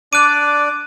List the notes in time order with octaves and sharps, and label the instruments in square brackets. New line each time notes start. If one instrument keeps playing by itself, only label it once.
[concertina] D4 D5 [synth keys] D6 [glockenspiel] F#6 D#7